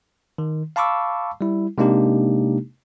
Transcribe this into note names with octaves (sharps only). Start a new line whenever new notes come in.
D#3
F5 A5 B5 C#6 D6 E6
G3 E4
C3 G#3 A#3 D4 D#4 G4